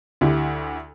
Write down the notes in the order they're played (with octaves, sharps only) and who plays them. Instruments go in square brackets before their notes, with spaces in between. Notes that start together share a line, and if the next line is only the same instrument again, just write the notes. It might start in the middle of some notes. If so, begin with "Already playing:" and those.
[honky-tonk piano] D2 E4 G4